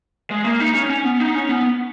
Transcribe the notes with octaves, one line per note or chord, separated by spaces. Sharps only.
G#3
A#3
D#4
C#4
C#4
B3
D#4
C#4
B3